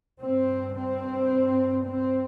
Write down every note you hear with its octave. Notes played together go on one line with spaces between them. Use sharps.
G2 C4
C4
C4